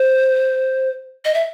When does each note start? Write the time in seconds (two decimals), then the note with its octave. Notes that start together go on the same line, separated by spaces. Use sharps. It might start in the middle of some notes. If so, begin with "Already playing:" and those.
Already playing: C5
1.25 D#5
1.34 E5